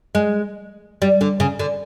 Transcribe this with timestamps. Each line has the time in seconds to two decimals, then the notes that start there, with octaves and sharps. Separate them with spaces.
0.15 G#3
1.02 G3
1.21 D3
1.40 C#3
1.59 D3